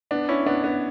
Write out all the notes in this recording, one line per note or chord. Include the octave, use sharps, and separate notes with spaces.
B3 D4
C#4 E4
B3 D4
B3 D4